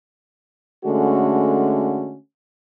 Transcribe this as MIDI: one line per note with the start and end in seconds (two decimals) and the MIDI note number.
0.85 2.15 50
0.85 2.15 56
0.85 2.15 57
0.85 2.15 61
0.85 2.15 66